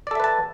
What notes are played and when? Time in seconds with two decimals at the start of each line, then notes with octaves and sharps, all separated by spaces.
0.07 D5
0.11 A4
0.15 E5
0.20 B4
0.24 A5